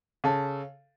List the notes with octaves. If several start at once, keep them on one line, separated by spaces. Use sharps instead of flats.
C#3 A4